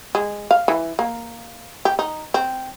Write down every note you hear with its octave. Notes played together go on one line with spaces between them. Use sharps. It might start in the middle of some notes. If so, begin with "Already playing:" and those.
G#3
F5
E3
A#3
G4
D#4
C4